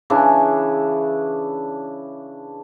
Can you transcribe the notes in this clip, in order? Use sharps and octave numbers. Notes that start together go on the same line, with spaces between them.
C#3 E3 D4